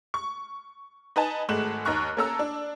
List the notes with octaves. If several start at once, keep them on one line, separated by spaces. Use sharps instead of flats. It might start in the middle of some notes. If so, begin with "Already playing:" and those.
C#6
D#4 B4 G#5 A5
G#1 G#3 A3 F#6 E7 F#7
D#2 D#4 A#5 C#6 F#6
A#3 C#4 A4 A#5 E6
D4